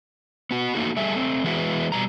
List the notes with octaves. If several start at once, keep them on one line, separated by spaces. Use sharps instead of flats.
B3 F#4
A3 A#3 D#4 F#4
G3 A3 G#4 A4 E5
A3 C4
E3 G#3 B3 E4 F#4 B4
B2 G3 A#5